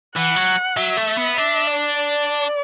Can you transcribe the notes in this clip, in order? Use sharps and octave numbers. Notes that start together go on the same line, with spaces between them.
E3 F#5
F#3
F#3 E5
A3
B3
D4 E5
D5
D5